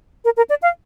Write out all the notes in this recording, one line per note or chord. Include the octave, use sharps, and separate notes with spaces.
A#4
A#4
D5
F5